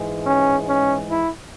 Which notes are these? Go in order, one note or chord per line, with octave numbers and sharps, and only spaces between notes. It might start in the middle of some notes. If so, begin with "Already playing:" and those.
Already playing: G#2 E3 G#3
C#4
C#4
E4